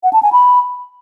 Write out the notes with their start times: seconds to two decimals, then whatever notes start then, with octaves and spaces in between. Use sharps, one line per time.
0.03 F#5
0.13 A5
0.23 G#5
0.32 B5